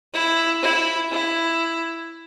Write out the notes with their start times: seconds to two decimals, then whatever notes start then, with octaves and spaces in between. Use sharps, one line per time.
0.14 E4
0.62 E4
1.12 E4